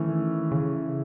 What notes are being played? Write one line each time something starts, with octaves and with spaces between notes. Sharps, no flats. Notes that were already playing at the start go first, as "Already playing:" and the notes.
Already playing: D#3 E3 A3 C#4 E4
C#3